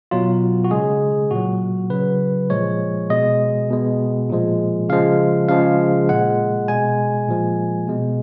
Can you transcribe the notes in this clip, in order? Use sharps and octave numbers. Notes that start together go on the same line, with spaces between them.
B2 F#3 F4
F#4
C#3 G#3 G#4
A#2 F#3 F#4
C#3 F#3 B4
A#2 F3 G#3 C#5
B2 G#3 D#5
B2 G#3
A#2 F3 G#3
C#3 F3 G#3 F5
C#3 F3 G#3 F5
A#2 G#3 F#5
B2 G#3 G#5
A#2 F3 G#3
B2 G#3